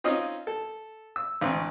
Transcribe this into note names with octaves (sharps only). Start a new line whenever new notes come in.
C4 C#4 D#4 F4 D#5
A4
E6
A1 D2 C4